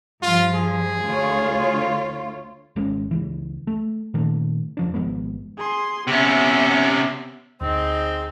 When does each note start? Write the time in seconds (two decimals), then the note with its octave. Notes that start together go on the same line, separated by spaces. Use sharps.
0.22 G2 F3 F4
0.54 G#4
1.07 D2 F4 C#5
2.76 G#1 G#3 C#4
3.11 C#2 E3
3.67 A3
4.14 A#2 D#3 A3
4.77 F1 F3 D4
4.94 G#1 F3 G#3 B3
5.58 G#4 C6
6.07 C3 B3 C#4 E5
7.61 D2 C4 D#4 G#4